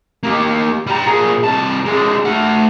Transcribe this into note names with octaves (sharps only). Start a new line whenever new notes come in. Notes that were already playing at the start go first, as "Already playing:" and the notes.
A#3 G4
G3 A#5
A#2 G#4
C2 A5
D3 G#3
A3 F#5